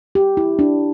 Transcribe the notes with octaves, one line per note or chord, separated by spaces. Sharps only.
G4
E4
D4